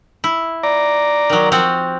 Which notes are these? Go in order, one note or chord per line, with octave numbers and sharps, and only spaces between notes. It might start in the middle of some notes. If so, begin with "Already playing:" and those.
E4
D5 A#5
D#3 F#3
F3 C4 F#4